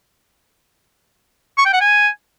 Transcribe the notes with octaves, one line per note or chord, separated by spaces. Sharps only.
C#6
G5
F#5
G#5